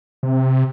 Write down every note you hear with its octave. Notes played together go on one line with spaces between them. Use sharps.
C3